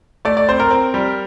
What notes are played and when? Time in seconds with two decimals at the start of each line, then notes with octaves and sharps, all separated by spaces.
0.25 A3 D5
0.37 D5
0.48 C4 C5
0.60 A#4
0.71 C4
0.94 G3